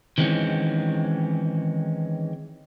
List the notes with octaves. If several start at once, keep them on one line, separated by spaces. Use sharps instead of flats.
D#3 E3 G#3 C4 C#4